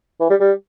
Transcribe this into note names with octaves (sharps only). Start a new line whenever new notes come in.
E3
G3
G3